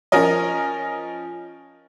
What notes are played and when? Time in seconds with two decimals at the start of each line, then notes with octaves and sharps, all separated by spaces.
0.12 F3 C#4 A#4 D#5